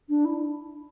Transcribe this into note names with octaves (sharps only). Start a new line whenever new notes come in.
D4
E4